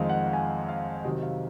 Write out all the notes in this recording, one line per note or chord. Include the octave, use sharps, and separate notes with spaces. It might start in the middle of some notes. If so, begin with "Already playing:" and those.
Already playing: F2 D#3 G#3 C4 D#5 F5
F#5
G#5
F5
C3 D#3 F#3 D#5
F5